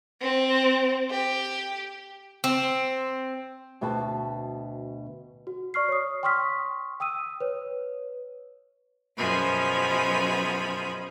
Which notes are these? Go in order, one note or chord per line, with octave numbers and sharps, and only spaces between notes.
C4
G4
C4
D2 B2 C4 B4 A5
F#4
D5 C#6 F6 C7
C#5 D#6
G5 C6 C#6 D#6 F6 B6
G5 D#6 E6 D#7
B4 C#5
F#2 B2 F3 G#4 B5